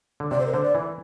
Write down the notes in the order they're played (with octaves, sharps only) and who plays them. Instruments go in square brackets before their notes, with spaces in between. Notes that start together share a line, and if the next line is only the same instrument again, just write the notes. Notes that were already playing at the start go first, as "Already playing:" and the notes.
[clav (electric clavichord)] D3
[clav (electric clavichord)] C3 [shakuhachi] D5
[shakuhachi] C5
A#4
[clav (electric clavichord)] D3 [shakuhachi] C5
[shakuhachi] D5
[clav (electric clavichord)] E3